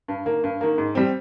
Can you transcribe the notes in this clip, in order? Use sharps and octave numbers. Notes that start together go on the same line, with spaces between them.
G2
D#3 A#3
G2
D#3 A#3
G#2
G3 C4